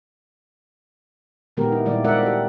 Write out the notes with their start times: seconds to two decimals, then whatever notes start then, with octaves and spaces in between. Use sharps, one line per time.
1.57 A#2 D#3 G#3 B3 G4 A#4
1.72 E4
1.85 A#2 D#3 G3 A#3 E4 D5
2.04 G#3 C4 A#4 D5 E5 F#5
2.23 G4 A4